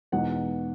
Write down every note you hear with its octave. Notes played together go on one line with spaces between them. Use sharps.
E2 B2 G#3 D#4 F#5